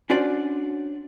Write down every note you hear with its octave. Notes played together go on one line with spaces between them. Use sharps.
C#4 D4 F#4 C5 D5